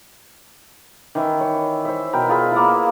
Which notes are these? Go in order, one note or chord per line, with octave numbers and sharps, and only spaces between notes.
D#3 E3 E4
C#5
C5 E5
B2 A#4 G5 B5
F4 G#4 B5
A#3 E4